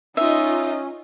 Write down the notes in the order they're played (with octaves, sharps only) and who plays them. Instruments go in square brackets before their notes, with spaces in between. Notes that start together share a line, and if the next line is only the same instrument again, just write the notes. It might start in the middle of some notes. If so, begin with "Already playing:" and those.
[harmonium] C#4 [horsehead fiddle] D#4 [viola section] F4 D#5 [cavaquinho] E5